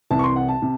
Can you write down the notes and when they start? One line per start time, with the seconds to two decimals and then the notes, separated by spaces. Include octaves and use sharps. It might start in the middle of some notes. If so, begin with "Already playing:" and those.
0.10 C2 C3 E3 A5
0.19 C#6
0.24 C6
0.36 F#5
0.48 A5
0.62 C3